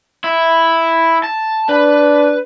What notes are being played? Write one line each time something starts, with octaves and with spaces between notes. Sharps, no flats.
E4
A5
D4 B4